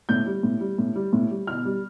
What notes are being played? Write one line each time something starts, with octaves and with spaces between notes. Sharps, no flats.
A2 G6
G3
A2
G3
A2
G3
A2
G3
B2 F6
G3